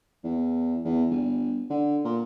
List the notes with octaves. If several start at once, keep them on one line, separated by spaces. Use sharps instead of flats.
E2
E2
G1
D3
A#2